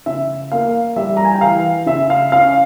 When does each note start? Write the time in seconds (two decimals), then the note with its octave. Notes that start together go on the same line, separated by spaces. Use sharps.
0.06 C#3 E5
0.52 A#3 F5
0.96 G3 E5
1.17 A#5
1.25 G#5
1.34 G5
1.41 E3 F5
1.86 C#3 E5
2.10 F5
2.32 C#4 F5